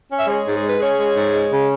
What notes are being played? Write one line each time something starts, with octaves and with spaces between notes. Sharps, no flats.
C#4
E5
G#3 G#4 C#5
G#2
G#4
G#3
B4
C#4 G#4 C#5
G#3
G#2
G#3
C#3